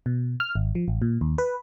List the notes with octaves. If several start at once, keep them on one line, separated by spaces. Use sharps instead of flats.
B2
F6
G#1
F3
A1
A#2
D#2
B4